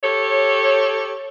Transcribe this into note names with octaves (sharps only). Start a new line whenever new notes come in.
G4 A4 C#5